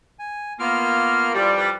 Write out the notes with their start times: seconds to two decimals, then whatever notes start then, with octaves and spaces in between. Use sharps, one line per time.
0.19 G#5
0.60 A#3 B3 F4 F6
1.35 F2 E3 G3 F4 D5
1.57 B4 D5 B5